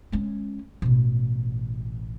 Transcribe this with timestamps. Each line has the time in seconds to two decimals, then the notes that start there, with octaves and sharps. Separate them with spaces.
0.12 G#3 C#4
0.82 A1 B2